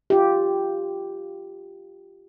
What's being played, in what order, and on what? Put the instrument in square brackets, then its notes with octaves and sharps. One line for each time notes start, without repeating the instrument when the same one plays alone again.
[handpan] F4 G4